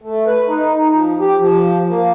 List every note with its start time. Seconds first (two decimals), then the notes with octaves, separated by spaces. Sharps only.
0.01 A3
0.27 B4
0.47 D#4
0.90 F3
1.20 G4
1.40 F3
1.89 A#3